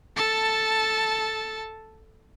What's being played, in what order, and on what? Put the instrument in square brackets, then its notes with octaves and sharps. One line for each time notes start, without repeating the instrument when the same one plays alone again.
[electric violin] A4 A5